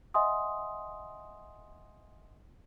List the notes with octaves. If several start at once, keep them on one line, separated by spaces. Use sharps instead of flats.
D#5 E5 F#5 G#5 C6 D#6